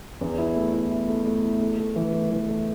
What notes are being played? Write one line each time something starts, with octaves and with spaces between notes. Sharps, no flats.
E2
E4
A3
E4
E4
A3
A3
E4
A3
A3
E3
A3
E3
A3